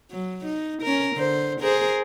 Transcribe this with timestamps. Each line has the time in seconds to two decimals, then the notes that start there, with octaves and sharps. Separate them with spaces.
0.11 F#3
0.46 D#4
0.83 C#4 A#4
1.16 D3 C5
1.61 G#4 A#4 C5